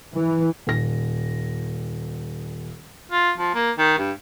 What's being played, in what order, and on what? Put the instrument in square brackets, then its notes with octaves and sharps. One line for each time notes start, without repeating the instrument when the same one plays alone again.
[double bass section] E3
[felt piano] D#1 A#6
[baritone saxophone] F4
F3
A#3
D#3
G2